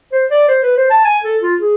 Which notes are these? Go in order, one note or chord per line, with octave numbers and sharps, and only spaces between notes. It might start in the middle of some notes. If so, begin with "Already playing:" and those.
C5
D5
C5
B4
C5
A5
G#5
A4
F4
G#4